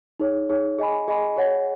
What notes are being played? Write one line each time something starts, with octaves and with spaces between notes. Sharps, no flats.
D#4 G#4 C#5
D#4 G#4 C#5
G#4 D#5 G#5 B5
G#4 D#5 G#5 B5
G#4 C#5 F#5